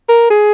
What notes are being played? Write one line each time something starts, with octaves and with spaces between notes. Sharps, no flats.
A#4
G#4